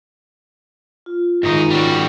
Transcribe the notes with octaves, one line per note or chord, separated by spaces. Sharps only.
F4
G#1 G#2 D#4 C#6 A#6
G3 C#4 F#4